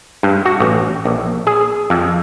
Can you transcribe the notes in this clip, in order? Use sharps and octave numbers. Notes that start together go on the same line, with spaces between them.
G2
F#4
A1
A#1
G#4
F2